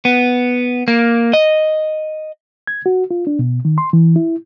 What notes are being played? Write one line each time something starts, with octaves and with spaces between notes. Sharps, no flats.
B3
A#3
D#5
G#6
F#4
F4
D4
B2
D#3
C6
E3
E4